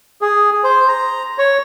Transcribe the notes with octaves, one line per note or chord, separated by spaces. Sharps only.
G#4
C5
A#5
C#5